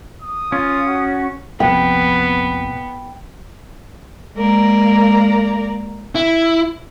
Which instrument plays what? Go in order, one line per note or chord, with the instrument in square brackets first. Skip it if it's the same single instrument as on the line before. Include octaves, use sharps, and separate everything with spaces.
[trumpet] D#6
[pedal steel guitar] C#4 [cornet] F4
[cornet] F#4
[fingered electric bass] F1 A#1 F2 [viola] B3 [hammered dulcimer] G5
[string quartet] G#3 A#3 A#4 D5 A#5
[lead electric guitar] E4